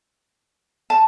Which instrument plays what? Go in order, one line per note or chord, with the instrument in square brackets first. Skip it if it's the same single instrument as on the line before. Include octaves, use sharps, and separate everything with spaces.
[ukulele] A5